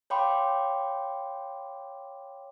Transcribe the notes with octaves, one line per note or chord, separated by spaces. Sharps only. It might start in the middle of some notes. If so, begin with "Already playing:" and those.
C#5 F5 G5 B5 C6 D6